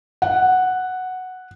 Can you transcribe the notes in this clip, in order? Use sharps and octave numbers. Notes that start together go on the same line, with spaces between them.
F#5